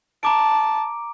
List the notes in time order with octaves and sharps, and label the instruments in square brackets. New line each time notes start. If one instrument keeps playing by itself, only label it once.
[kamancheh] A5 [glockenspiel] A#5 D6 D7